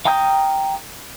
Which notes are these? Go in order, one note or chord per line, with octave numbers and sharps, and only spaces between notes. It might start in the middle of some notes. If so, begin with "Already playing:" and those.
F5 G5 A#5 D#6 G6